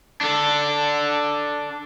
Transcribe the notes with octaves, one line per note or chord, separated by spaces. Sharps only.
D4 A4